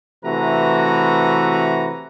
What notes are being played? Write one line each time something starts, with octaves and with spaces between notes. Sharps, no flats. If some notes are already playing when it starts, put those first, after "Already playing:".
C3 E3 A3 F#4 B4 A#5